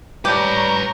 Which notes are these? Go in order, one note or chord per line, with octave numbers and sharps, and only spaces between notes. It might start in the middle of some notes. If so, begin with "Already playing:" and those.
G3 G4 B4 C#5 A5 A#5 C#6